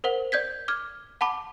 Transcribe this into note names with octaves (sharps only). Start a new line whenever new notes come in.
A#4 C5 F#5 F#7
D5 G6 G#6 B6
D6 F6 G#6
F#5 A5 B5 D6